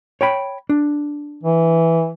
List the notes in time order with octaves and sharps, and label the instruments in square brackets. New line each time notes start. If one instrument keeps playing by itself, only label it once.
[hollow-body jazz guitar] C#5 G5 B5
D4
[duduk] E3